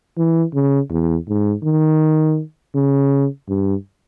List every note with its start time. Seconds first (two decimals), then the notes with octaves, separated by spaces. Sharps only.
0.17 E3
0.54 C#3
0.90 E2
1.28 G#2
1.64 D#3
2.75 C#3
3.49 G2